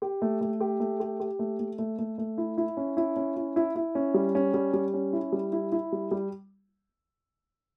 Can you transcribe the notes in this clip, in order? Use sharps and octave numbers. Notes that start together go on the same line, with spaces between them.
G4
A3
A3
G4
A3
G4
G4
A3
A3
A3
A3
A3
E4
E4
C#4
E4
C#4
E4
E4
E4
C#4
G3
C#4
G3
G3
C#4
E4
G3
E4
E4
G3
G3